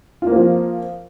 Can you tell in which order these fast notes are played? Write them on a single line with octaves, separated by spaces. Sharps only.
F4 A#3 C4 F3